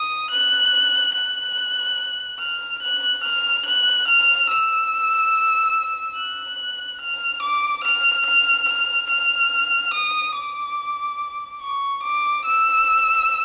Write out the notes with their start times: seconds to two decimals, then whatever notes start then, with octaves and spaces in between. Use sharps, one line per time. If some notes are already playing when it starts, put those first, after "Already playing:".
Already playing: D#6
0.31 F#6
1.14 F#6
2.40 F6
2.82 F#6
3.24 F6
3.65 F#6
4.07 F6
4.49 E6
6.17 F#6
7.01 F6
7.42 D6
7.84 F6
8.26 F6
8.68 F6
9.10 F6
9.94 D#6
10.36 D6
11.61 C#6
12.03 D6
12.45 E6